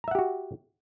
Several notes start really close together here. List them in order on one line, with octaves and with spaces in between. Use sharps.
A#5 E5 F#5 G4 F#4